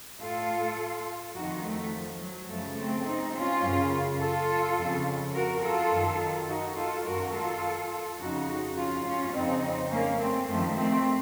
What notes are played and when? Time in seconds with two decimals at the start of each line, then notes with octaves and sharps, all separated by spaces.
0.21 A2 F4 A4
1.34 F2 D#3 D#4 F#4
1.63 F3 A3
1.92 F3
2.20 F#3
2.48 F#2 C#3 F3 A3
2.77 A3 C4
3.06 C4 D#4
3.34 C#4 F4
3.63 F#2 C#3
4.20 F4 A4
4.77 F2 C#3
5.34 F#4 A#4
5.62 F4 A4
5.91 F#2 D#3
6.48 D#4 F#4
6.77 F4 A4
7.05 F#2 D#3 F#4 A#4
7.34 F4 A4
8.19 F2 C#3 D#4 F#4
8.77 C#4 F4
9.05 C#4 F4
9.34 F2 C#3 C4 D#4
9.91 A#3 C#4
10.19 A3 C4
10.48 F#2 D#3 F3 A3
10.76 A3 C4